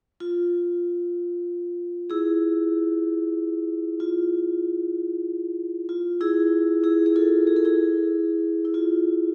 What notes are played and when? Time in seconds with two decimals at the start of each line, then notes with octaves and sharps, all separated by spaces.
0.20 F4
2.10 E4 G#4
4.00 F4
5.89 F4
6.21 E4 G#4
6.84 E4 G#4
7.06 G#4
7.16 F4 A4
7.47 G#4
7.56 A4
7.65 E4 G#4
8.65 E4
8.74 F4